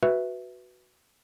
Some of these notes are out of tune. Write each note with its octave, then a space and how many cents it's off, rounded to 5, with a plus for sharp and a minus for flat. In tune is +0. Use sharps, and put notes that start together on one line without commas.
F#4 +5 B4 +0 E5 +0